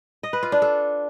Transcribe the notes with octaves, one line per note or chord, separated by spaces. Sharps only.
D#5
B4
F4
D4
A4